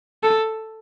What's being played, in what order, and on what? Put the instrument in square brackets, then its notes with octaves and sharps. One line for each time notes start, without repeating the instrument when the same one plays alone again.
[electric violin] A4